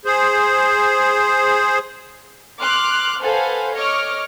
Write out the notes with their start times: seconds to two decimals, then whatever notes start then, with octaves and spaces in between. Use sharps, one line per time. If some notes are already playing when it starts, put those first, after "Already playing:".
0.05 G#4 C5
2.59 C6 D6 F6 F#6
3.23 A4 B4 C5 F5 F#5 G#5
3.74 C#5 D#5 C#6 D6 F6